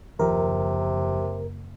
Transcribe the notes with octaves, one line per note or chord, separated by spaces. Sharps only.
F#1 D#2 C3 F3 G4 A#4